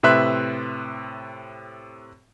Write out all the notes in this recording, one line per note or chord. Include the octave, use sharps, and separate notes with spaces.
A2 C3 B4 E5 C6 F#6